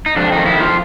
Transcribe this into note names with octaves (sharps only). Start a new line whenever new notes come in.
D#4
F2 D4
D#3 D#4
E4
F2
F4